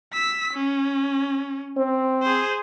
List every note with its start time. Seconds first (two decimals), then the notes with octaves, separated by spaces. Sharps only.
0.13 E6 B6
0.54 C#4
1.77 C4
2.23 G#4 C5